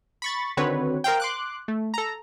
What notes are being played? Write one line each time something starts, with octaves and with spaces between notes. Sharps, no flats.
B5 C#6 A6
D3 D#3 C4 F#4 B4 C#5
A#4 C5 F5 G5
C6 D6 F#6
A3
A4 A#5